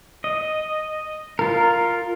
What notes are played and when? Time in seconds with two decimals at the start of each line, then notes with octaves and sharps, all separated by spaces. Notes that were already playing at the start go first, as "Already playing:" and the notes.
0.24 D#5
1.39 F4 A#4